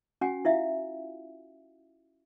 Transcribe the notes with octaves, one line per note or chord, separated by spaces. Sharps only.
C#4 F#4 F#5 G#5
E4 F4 E5 F5